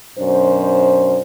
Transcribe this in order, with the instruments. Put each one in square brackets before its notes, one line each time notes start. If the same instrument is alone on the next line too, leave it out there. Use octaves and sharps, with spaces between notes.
[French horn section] F#2 B2 D4 C5